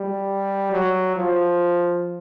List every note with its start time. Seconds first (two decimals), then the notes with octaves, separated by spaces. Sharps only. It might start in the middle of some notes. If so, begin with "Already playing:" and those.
Already playing: G3
0.72 F#3
1.16 F3